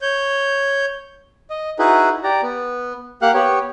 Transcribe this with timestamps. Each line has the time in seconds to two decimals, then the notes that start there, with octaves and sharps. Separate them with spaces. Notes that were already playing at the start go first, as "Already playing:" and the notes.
0.02 C#5 G6
1.50 D#5
1.79 D#4 E4 F#4 G#4 B4
2.24 G4 D5 A#5
2.42 B3
3.22 A#3 G4 F5 F#5 F#6
3.34 B3 G4 C#5